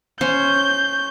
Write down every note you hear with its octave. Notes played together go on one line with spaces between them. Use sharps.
C#4 C5 G6